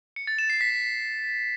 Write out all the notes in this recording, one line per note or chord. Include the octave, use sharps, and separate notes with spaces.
C#7
A6
E7
C7
B6